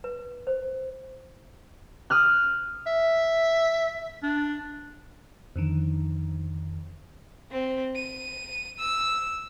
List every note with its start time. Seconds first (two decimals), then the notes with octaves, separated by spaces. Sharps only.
0.04 B4
0.47 C5
2.10 D#6 F6 F#6
2.87 E5
4.23 D4
5.56 F2 D3 D#3
7.51 C4
7.96 D#7
8.79 E6